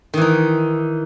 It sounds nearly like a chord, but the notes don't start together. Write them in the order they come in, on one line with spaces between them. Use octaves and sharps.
D#3 E3 D#4